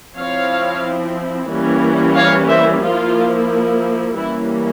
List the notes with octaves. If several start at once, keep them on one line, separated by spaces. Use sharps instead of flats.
F3 C4 E4 C#5 F5
E3 G3 A#3 C#4
C#5 F5
C5 E5
F3 A#3 E4 F4
E3 G3 A#3 C#4 E4